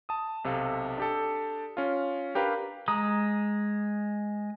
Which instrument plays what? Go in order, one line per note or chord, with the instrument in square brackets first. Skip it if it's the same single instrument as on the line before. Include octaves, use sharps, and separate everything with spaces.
[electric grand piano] A5 D#6
B1 C3 A4 F5
D4 G4 A4
C#4 F4
D4 G4 A#4 B4 F5
[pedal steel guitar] G#3 A#5 D#6